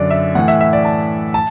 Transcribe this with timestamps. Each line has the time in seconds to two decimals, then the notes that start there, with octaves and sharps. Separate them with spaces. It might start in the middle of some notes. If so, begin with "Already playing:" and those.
Already playing: F#2 D3 D5
0.11 E5
0.35 A2 E3 F#5
0.48 E5
0.61 E5
0.73 D5
0.85 A5
1.34 A5